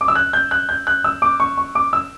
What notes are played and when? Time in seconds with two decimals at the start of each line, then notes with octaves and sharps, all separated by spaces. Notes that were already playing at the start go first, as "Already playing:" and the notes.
0.01 D6
0.08 E6
0.15 F#6
0.33 G6
0.51 F#6
0.69 G6
0.87 F#6
1.04 E6
1.22 D6
1.40 C#6
1.58 C#6
1.75 D6
1.93 E6